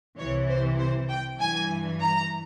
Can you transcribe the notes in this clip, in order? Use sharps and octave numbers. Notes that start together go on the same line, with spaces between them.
C2 C3 E3 C#5
C5
C5
G5
G2 E3 G#5
A#5